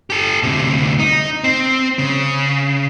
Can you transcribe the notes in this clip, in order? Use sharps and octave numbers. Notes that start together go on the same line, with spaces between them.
G4 A4
D2 C3
D#4
C4
C#3